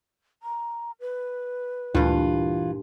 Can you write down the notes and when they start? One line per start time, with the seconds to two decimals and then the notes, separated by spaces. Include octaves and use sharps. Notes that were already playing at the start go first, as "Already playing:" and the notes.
0.43 A#5
1.00 B4
1.95 D2 G2 A#2 E3 F4